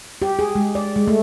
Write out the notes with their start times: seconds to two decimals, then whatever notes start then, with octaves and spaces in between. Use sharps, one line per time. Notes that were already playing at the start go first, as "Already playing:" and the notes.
0.22 G4
0.39 G#4
0.55 G#3
0.75 D5
0.96 G#3
1.08 A3